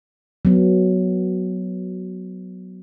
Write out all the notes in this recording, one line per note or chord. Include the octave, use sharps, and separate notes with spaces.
F#3 B3